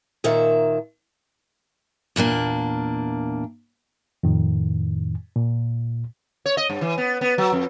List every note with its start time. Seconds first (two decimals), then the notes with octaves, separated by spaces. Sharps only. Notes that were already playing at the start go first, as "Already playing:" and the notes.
0.24 D#2 A#2 D#3 E5
2.16 E2 A#2 A#3 D4
4.23 F2 A2 D#3
5.36 A#2
6.46 C#5
6.57 D#5
6.69 G2
6.81 E3
6.98 B3
7.21 B3
7.38 F#3
7.52 F2